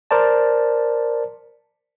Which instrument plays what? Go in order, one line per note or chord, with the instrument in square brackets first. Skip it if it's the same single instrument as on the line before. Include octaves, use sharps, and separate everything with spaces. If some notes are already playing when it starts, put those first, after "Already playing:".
[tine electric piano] A#4 C5 D5 A5